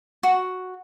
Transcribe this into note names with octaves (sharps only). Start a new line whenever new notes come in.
F#4